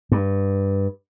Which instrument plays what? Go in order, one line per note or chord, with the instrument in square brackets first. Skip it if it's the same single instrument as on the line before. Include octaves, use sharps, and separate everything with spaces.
[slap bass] G2